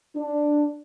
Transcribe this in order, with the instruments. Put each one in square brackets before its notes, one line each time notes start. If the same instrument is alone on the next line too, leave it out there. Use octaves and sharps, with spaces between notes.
[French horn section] D4